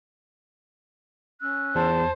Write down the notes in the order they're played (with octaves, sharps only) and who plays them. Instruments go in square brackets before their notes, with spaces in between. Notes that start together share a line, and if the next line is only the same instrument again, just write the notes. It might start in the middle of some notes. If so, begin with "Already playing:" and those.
[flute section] C#4 E6 F#6
[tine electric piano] E2 [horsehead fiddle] C5 [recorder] A5